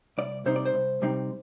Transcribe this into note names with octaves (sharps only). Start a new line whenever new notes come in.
C2 D5
C3 G3 C4 D#4 C5
D5
C5
C2
C3 G3 C4 D#4